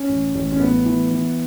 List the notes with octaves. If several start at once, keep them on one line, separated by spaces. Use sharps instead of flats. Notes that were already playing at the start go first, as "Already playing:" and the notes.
Already playing: C#4
A1
A1
C#4
A2 B3
E3
E3